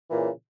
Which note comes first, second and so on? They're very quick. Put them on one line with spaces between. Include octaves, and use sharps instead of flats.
E3 A#2 C#3